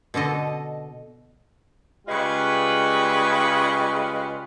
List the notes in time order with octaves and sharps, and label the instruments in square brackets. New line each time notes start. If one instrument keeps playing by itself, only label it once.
[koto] B2 D3 A4 D#5
[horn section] C#3 G3 G#3 F4 B4